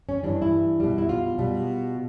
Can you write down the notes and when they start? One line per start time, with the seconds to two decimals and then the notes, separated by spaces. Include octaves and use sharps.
0.09 C#4
0.23 G2 E3 G3 D4
0.42 E4
0.80 B2 G3
0.98 E4
1.09 F4
1.39 B2 G3